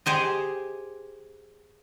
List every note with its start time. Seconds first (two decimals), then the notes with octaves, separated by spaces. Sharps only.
0.06 G4 G#4 C5 D#5